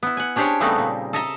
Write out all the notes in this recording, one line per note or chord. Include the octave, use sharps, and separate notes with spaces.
B3 E4
F#5 G#5
C#4 D4 G4 G#4 C5 C#5
C#3 G3 A3 B3 C4 D#4
A#2
A4 D#5 E5 A5 A#5